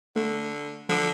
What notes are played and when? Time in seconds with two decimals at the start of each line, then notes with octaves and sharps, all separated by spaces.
0.16 D3 A3
0.89 D3 F3 D6